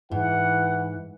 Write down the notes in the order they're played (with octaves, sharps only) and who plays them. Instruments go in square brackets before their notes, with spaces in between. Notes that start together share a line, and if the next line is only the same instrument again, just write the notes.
[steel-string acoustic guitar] G#2 [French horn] E3 [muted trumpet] F#5